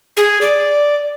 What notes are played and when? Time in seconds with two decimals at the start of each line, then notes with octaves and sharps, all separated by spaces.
0.17 G#4
0.41 D5